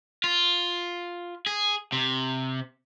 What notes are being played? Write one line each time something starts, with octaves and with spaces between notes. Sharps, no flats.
F4
G#4
C3